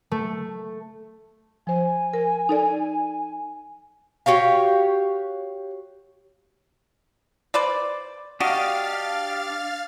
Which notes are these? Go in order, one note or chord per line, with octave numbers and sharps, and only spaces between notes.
A3
F3 C5 G#5
A#4
D#4 A4 D5
F#4 G4 C#5 F5
B4 C5 D5
D4 F#4 G4 D#5 F5 F6 A6